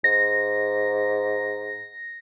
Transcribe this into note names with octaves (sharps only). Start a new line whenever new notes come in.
G#2 A#6